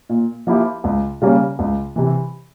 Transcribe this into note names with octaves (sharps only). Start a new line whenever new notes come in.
A#2
F3 A#3 E4 G4
C#2
C#3 G3 A#3 C#4
C#2
C3 E3